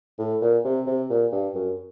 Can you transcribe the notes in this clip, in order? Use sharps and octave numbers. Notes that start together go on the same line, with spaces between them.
A2
A#2
C3
C3
A#2
G2
F#2